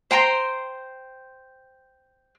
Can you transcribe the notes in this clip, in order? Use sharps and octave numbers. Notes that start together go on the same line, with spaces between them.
C5 G5 A#5 C6